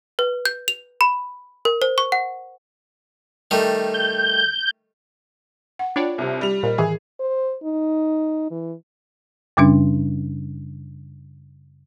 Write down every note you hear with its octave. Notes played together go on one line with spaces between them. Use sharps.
B4
G6
F7
B5
A#4
C5
C#6
F#5
D#3 G3 A3
G6
F#5
D4 F4 C#5 D5 G5 B5
C2 C3
G3 F7
A#2 A#4 C5 D#5
A2 D#3 E3 G#4
C5
D#4
E3
F#2 C#3 G3 C#4 D4